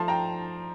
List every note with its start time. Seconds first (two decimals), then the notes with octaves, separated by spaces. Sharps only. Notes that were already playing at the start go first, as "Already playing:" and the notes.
Already playing: F3 A3 A5 C6
0.08 G5 A#5